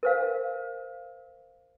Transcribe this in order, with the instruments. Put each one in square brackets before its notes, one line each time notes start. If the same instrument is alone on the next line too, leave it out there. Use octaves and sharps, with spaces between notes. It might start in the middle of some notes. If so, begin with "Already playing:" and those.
[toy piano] A#4 C5 F5